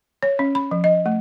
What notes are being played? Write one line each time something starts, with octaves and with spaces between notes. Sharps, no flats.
C#5
C#4
B5
F3
D#5
A3